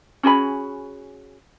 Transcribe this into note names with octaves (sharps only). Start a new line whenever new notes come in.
C#4 F#4 G#4 B5